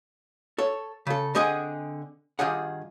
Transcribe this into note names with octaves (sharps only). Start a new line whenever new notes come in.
A4 C#5
C#3 A4
D3 C4 G#4 D#5 F#5 G#5
G2 D#3 F4 G#4 F#5